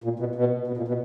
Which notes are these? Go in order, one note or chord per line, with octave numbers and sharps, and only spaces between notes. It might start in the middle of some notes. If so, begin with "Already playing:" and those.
A#2
B2
B2
B2
A#2
B2